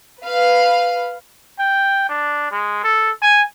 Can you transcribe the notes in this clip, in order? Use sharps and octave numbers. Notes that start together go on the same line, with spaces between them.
B4 F5
G5
D4
G#3
A4
G#5